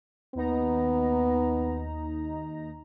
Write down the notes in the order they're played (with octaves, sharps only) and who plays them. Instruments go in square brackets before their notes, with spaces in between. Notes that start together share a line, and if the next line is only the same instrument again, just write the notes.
[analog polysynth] D#2 D#4 A#5 [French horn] B3